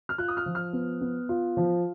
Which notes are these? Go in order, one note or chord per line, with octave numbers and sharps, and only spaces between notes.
F6
F4 F#6
D#6
F6
F3
F6
B3
B3
F4
F3